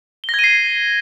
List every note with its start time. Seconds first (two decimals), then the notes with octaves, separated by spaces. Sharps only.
0.24 G7
0.29 A#6
0.34 G#6
0.39 D#7
0.44 C7